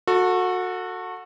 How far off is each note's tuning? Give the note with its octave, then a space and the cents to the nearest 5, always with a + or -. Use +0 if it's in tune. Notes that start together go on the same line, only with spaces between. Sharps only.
F#4 -20 A4 +20